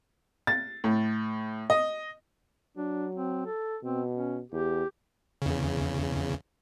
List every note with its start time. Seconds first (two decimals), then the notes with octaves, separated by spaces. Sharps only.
0.47 A6
0.84 A2
1.70 D#5
2.77 F#3 D4
3.15 C4
3.46 A4
3.83 B2 C4
4.14 C#4
4.52 E2 G4
5.42 E2 C#3